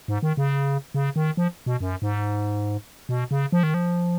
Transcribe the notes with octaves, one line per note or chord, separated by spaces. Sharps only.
G#2
D#3
C#3
C#3
D#3
F3
B2
F#2
G#2
B2
C#3
F3
D#3
F3